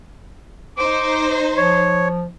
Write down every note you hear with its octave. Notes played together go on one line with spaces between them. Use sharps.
D#4 C5 D6
F3 C#5